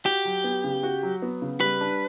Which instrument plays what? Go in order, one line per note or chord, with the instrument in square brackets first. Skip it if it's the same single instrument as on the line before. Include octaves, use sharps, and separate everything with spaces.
[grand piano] F#4 [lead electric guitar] G4
[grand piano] F#3
B3
C#3
F#4
F#3
B3
C#3
[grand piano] G3 [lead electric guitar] B4
[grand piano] D4